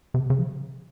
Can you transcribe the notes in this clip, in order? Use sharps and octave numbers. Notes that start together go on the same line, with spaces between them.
C3
C#3
F3